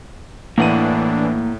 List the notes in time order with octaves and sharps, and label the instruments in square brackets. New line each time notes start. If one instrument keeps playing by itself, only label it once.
[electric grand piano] A2 D#7 [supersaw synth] E3 D4 [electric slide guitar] A#3 F#5